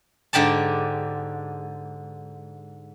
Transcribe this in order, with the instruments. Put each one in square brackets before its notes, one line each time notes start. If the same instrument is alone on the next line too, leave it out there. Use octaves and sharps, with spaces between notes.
[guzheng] G#2 D3 G4 D5 A5